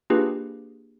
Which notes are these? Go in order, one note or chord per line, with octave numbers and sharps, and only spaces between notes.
A#3 D4 F4 G4 G#4 B4